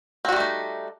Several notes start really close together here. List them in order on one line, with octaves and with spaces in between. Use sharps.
C4 F#4 G3 A3 D#4